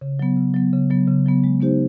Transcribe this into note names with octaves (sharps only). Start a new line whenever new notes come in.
C#3
F#3 B3
C#3
F#3 B3
C#3
F#3 B3
C#3
F#3 B3
G#3
B3 D#4 G4 C5